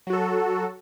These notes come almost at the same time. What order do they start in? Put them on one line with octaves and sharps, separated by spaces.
F#3 F#4 A4